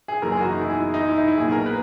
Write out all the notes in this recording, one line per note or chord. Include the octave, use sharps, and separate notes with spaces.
G#4
F#1 F#2 E3 A#3 A#4
G#4
F#4
D#4
E4
G#4
E4
D#4
E4
D#4
E4
B1 A#2 A#3 G#4
G#4
A#4
B4